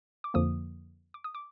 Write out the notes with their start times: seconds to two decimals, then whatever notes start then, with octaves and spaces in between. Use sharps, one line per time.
0.24 D6
0.34 F2 D3 F3 A#3 D#6
1.14 D6
1.24 D#6
1.35 D6